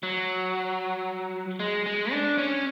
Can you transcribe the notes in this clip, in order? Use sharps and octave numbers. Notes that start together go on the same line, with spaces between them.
F#3
G#3
G#3
D4
C#4